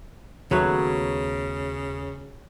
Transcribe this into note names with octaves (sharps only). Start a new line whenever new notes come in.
D#2 C#3 F#3 A3 B3 B4 C#5